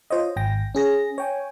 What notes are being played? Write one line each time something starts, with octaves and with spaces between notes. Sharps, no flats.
F4 C5 C#5 D#5
G#1 G5 A#6
C#4 G#4 A#6
C#5 G5 G#5